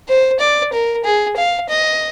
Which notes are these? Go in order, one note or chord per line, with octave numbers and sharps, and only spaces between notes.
C5
D5
A#4
G#4
F5
D#5